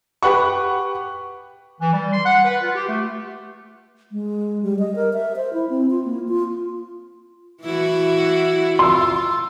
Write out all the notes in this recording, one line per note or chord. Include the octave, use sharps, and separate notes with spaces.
G4 B4 F#5 C#6
E3
G3
C6
F#5
B4
F4
G4
A3
G#3
G3
D#5
A#4
E5
C5
E4
C4
F4
A#3
F4
E3 E4 F#4
F4 C6 E6